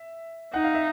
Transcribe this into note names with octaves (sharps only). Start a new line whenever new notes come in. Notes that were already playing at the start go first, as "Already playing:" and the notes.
Already playing: E5
D#4 F#5
F5
E5